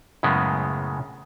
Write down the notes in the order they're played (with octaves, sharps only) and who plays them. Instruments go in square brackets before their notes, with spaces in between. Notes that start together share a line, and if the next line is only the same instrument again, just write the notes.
[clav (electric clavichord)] F#2 A2 C#3 G#3 B3